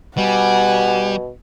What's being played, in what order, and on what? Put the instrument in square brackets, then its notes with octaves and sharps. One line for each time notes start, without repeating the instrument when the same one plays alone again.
[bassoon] B2 [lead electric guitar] G3 [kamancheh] F#5 G#5